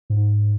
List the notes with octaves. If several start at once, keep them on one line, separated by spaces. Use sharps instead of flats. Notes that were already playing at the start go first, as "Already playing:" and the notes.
G#2